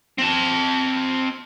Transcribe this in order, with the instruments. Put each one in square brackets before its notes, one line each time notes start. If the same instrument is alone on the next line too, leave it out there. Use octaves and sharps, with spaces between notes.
[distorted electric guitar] C4 A5